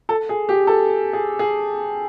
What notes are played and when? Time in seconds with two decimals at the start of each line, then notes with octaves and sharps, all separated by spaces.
0.09 A4
0.29 G#4
0.49 G4
0.67 A4
1.13 G#4
1.39 G#4